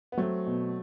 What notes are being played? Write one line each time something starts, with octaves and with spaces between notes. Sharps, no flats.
B3
F#3 A3 C4
B2